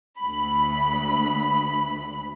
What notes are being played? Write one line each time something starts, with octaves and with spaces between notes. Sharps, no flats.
D2 B5